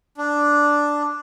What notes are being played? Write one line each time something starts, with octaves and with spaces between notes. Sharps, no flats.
D4